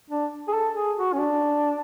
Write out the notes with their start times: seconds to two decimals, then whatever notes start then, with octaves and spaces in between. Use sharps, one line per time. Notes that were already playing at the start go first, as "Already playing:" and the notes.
0.10 D4
0.48 G#4
0.54 A4
0.76 G#4
0.98 F#4
1.13 C#4
1.19 D4